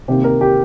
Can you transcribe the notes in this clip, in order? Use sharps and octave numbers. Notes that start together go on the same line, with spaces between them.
C3 D#3 A#3 G4
A#4
G4